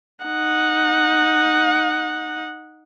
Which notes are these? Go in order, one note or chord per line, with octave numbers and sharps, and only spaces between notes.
D#4 F#5